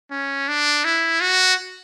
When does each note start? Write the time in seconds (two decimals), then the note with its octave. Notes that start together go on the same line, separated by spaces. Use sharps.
0.11 C#4
0.48 D4
0.85 E4
1.21 F#4